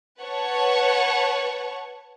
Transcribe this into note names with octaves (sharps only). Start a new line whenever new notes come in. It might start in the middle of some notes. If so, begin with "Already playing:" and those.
B4 C#5 F#5 A5 C#6